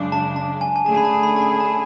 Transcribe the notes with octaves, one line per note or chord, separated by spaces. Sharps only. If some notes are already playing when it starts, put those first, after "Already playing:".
Already playing: F#2 C#3 G#3 D4
A5
A5
G#5
G#5
D3 A3 C#4 G#4 A5
B5
A5
B5
A5
B5
A5